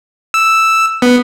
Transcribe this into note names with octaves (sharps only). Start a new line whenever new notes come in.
E6
B3